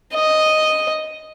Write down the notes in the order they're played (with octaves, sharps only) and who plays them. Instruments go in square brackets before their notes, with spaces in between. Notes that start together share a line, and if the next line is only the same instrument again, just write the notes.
[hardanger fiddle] D#5